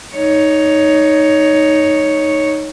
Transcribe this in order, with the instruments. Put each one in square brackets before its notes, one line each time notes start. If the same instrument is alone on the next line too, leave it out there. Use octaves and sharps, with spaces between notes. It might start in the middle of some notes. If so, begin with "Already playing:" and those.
[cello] D#4 C#5